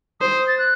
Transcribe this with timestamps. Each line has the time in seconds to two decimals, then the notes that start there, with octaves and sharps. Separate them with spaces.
0.20 C5 D#6
0.48 A6
0.58 F#6